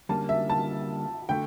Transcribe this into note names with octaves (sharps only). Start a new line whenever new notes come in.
D3 G3 A#3 C#4 A5
E5
A5
D3 A3 G5